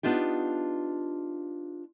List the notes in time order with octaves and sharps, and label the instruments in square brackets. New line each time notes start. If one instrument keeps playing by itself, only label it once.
[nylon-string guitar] B3 D4 D#4 F4 G4